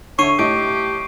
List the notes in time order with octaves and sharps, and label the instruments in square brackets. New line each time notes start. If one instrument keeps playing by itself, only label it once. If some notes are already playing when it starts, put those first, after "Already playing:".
[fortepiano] D3 E5 [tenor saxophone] C#5 [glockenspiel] C#6 C7 D#7
[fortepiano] A2 E4 D#5 [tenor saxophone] G4 [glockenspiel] D7